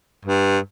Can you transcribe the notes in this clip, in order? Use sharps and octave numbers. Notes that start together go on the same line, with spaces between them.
G2